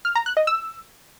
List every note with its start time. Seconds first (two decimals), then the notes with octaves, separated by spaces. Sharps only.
0.05 F6
0.15 A#5
0.26 F#6
0.37 D#5
0.47 E6